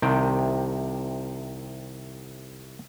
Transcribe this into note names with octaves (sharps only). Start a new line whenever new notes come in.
C2 C3 D#3 G5